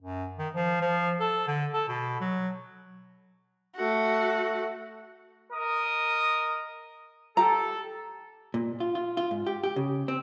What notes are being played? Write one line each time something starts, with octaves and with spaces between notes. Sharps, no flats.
F#2
D#3
F3
F3
A4
D3
A4
B2
F#3
A3 F#4
A#4 D#5 D#6
G4 A4 A#5
A#2
F4
F4
F4
G#2
G4
G4
C#3
C4